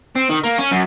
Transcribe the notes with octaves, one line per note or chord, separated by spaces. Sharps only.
C4
D#3
A#3
C#4
F#2